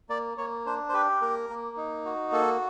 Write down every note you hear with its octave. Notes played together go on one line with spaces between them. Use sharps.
A#3 D5
A#3 C#5
D4 C5
C5
G4 B4
A#3 A#4
A#3
D#4
F#4
A#3 A4